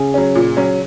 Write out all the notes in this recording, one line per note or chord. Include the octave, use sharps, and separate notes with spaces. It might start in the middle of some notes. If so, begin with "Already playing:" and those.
Already playing: C#3
F#3 C#4
A#2
F#3 C#4